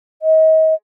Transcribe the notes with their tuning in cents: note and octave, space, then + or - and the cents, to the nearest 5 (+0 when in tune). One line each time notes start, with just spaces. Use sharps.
D#5 +35